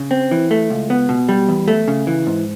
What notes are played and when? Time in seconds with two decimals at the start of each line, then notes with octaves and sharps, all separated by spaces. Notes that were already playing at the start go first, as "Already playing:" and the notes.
Already playing: C#3
0.11 C4
0.31 E3
0.51 A3
0.70 C#2
0.90 B3
1.09 B2
1.29 G3
1.49 E2
1.68 A3
1.88 C#3
2.07 E3
2.27 G#2